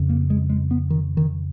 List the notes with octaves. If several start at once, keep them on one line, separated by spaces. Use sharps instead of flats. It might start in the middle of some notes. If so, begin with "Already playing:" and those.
Already playing: F2 C#3
A#3
G#3
G#3
B3
D#3
D#3